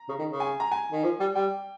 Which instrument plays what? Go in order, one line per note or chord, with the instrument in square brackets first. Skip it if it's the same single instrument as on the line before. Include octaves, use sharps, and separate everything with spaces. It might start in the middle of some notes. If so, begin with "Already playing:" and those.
Already playing: [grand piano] A#5
[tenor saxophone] C#3
D#3
C#3
[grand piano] G#5
A#5
G#5
[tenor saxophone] D#3
F3
G3
[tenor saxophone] G3 [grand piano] G5